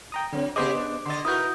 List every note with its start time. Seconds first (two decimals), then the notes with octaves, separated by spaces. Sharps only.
0.12 G5 A#5 D#6
0.33 D3 F#3 C4
0.56 C#3 B3 G4 G#4 C5 D#5 D6
0.75 D4
1.06 D3 D#5 C6 A6
1.25 D#4 E4 F#4 A#4 B4 D#6 G6